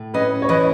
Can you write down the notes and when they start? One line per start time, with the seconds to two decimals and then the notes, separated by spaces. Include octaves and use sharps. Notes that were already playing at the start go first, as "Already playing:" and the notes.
Already playing: A2
0.14 C#4 B4 D#5
0.42 C#5
0.49 E3 B4 D#5